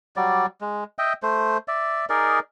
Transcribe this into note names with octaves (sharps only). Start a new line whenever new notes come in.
F#3 G3 D5
G#3
D#5 E5 G5
A3 C5
D5 E5
D#4 G#4 A#4 D5